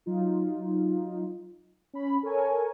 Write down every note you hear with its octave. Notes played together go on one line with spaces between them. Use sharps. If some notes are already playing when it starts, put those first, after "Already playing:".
F#3 D#4 F4
C#4 B5
A4 A#4 C#5 G#5